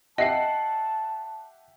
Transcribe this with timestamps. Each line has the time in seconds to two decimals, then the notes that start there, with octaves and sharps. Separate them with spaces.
0.18 G4 D#5 E5 F#5 A5 C7